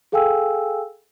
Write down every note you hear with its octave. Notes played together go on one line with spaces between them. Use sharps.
G#4 A4 F5 G5 G#5 E6